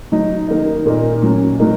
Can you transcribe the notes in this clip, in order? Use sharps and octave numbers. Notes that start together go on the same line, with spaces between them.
F#3 D#4
D#3 A#3 D#4
A#2 A#3 D#4
F#3 C#4
F#3 A#3 D#4